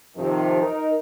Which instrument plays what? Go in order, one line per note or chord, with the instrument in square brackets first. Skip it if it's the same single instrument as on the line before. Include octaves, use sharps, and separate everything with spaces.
[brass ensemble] F2 C3 D#3 F3
D#4 A#4